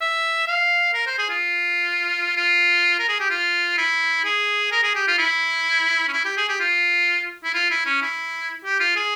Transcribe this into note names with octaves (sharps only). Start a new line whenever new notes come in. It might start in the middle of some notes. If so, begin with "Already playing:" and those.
E5
F5
A#4
C5
G#4
F4
F4
A#4
G#4
G4
F4
E4
G#4
A#4
G#4
G4
F4
E4
C#4
E4
G4
G#4
G4
F4
E4
F4
E4
C#4
E4
G4
F4
G#4